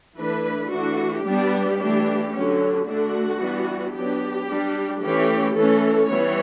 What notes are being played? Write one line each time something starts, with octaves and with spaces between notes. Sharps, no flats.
E3 A3 D4 B4
E3 A3 D4 F#4
G3 B3 D4 G4
E3 A3 D4
D3 F#3 C#4
D3 A3 D4 F#4
E3 G3 B3 D4
F#3 B3 D4 G4
G3 D4
E3 A3 C#4 G4
E3 A3 C#4 A4
E3 G3 B3 C#5